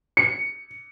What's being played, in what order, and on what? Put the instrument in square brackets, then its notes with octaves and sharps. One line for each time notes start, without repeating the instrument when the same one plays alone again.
[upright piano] C#7